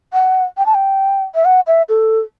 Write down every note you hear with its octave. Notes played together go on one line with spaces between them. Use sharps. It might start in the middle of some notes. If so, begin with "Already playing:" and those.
F#5
G5
A5
G5
E5
F#5
E5
A4